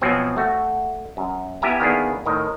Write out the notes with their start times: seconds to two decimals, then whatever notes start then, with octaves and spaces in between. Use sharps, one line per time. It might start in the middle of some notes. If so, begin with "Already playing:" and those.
0.01 B2 F3 F#3 C4 G#5
0.37 A3 F#4
1.17 F#2
1.62 B3 E4 G4 E5 G#5 A#5
1.80 D#3 A#3 B3 D4 E4 G#4
2.26 A2 D#3 A#4 D#5